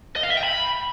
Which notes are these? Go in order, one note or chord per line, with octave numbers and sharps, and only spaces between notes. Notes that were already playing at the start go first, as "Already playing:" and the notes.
D#5
F5
E5
G5
B5